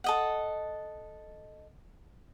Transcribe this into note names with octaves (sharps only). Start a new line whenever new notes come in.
A4 D#5 F#5